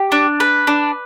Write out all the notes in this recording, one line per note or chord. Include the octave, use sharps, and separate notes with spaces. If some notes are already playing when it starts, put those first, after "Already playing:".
Already playing: G4
D4
B4
D4